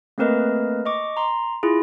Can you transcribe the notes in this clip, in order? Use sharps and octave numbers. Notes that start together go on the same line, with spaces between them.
A3 A#3 C4 A#4 B4 D#5
D#5 C#6 D6
A#5 C6
E4 F4 G#4